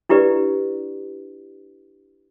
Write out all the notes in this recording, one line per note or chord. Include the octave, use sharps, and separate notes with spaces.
D4 E4 G4 B4 D5